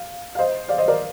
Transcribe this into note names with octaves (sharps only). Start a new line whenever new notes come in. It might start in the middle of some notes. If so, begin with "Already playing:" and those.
Already playing: F5
F5
C5 D#5
D5 F5
C5 D#5
A#4 D5